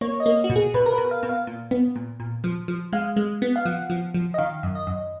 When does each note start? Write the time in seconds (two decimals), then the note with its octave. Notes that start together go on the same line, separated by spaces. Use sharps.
0.01 A#3 C#5
0.20 D#5
0.26 A#3
0.44 F#4
0.50 B2
0.56 G#4
0.74 B2 B4
0.86 A#4
0.92 B4
0.98 B2
1.11 F5
1.23 B2
1.29 F5
1.47 A#2
1.71 B3
1.96 A#2
2.20 A#2
2.44 F3
2.68 F3
2.93 G#3 F5
3.16 G#3
3.42 B3
3.56 F5
3.65 F3 F#5
3.90 F3
4.14 F3
4.34 D#5
4.38 D#3 F5
4.63 F#2
4.75 D#5
4.87 F#2